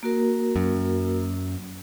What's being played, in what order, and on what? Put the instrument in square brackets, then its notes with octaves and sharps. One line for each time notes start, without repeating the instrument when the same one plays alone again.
[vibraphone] A#3 F#4 A#4
[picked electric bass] F#2